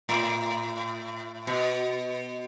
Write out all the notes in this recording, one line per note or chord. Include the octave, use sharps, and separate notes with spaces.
A2
B2